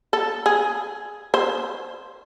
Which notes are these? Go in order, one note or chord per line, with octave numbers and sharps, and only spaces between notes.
A4
G#4
C5